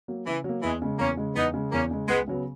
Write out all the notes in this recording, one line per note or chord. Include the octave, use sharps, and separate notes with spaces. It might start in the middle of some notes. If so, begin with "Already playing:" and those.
F#3 A#3
C#3 E3
F#3 A#3
E2 E3 G#3
C#3 G#3
E2 A#3 C#4
C#3 G#3
E2 B3 D#4
C#3 G#3
E2 A#3 C#4
C#3 G#3
C#2 G#3 B3
C#3 F#3 B3